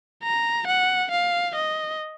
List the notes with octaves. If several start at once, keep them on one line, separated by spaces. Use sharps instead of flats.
A#5
F#5
F5
D#5